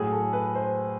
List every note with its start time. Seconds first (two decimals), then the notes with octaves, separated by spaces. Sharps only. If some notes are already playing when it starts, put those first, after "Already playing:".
Already playing: A2 F#3 G#4
0.12 A4
0.33 B4
0.55 C5